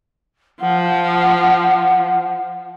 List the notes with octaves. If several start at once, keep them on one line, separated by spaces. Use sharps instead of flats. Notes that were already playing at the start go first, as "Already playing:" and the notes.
F3 F#5